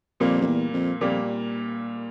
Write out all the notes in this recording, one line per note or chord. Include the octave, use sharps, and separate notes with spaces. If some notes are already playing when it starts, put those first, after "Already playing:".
F2 A#2 G3 A#3
F2
E2
F2
F2 A#2 G3 A#3